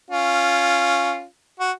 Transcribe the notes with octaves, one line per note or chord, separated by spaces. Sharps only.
C#4 F4
F#4